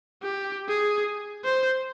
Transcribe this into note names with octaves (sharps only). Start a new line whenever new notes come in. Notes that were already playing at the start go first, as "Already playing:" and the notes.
G4
G#4
C5